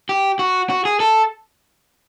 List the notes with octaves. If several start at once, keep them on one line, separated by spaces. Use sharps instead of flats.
G4
F#4
F#4
G#4
A4